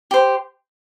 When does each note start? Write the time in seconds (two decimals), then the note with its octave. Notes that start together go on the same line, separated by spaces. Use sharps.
0.11 G4 C5